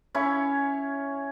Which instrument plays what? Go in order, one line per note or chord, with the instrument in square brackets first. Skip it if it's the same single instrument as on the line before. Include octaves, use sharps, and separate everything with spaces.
[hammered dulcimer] C#4 E4 C#5